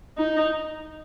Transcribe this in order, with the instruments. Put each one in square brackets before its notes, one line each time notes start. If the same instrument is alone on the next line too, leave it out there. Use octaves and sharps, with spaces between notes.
[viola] D#4